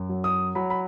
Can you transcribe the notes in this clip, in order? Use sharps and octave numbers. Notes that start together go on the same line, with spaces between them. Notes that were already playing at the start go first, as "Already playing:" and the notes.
Already playing: F#2
F#3
D#6
F#3 B5
B5